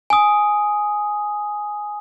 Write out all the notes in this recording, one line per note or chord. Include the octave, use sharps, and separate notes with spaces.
G#5 D#6